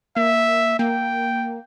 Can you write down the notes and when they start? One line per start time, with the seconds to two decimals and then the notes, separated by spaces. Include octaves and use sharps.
0.16 A#3 E5
0.79 A#3 G5